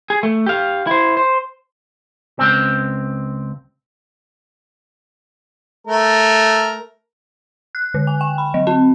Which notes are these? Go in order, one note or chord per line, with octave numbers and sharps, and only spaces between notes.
G#4
A3
G4 F5
E4 C5
C5
C#2 C4
A3 A#4
F#6
D3
G#5
G5
B5
F#3
C4